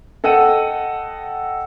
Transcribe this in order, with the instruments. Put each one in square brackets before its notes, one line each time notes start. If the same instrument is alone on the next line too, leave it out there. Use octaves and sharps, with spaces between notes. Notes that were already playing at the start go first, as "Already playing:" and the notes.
[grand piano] A4 D#5 F#5 G5 D#7